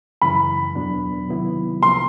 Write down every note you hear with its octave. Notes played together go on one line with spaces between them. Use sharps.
F#2 C#3 E3 B5
E2 B2 F#3 B3 D4
C3 D#3 F#3 B3 E4
C2 C3 F3 A#3 C6